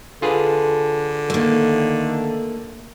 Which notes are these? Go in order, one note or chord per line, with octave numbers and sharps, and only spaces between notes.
D3 F4 G#4 A4 B4
D#3 A3 A#3